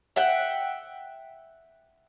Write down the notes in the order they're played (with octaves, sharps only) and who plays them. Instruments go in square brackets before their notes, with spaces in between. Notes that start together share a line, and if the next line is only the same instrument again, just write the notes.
[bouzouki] E5 F#5 G5